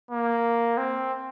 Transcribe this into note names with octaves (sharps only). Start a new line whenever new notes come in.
A#3
C4